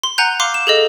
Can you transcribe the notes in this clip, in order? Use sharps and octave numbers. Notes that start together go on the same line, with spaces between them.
C6
F#5 G#5 A#5 F#6 G6
F5 C6 D6 F6
E7
G#4 A4 D#5